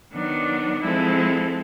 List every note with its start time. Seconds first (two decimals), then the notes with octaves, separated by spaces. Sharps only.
0.13 D#3 F#3 B3 D4
0.82 F3 G#3 C4 E4 A4